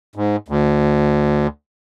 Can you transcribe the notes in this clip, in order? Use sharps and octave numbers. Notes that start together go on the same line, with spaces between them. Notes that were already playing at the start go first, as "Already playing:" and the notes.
G#2
D2